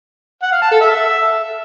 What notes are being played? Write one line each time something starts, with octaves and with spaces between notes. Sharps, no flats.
F#5
F5
A5
A4
E5